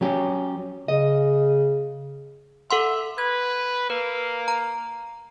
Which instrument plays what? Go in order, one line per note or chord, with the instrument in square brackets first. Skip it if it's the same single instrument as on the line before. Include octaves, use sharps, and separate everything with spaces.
[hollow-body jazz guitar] F#3 C#4 G4
[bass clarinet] C#3 [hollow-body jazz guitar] D#5
[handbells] A4 F#5 C6 [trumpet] E5
[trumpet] B4 [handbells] G#6
[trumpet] A#3 [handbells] B4
[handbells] A#5